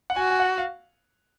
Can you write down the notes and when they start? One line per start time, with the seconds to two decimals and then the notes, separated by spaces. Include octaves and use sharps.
0.10 F#5
0.16 F#4 G#5
0.30 G#5
0.40 F#5
0.58 F5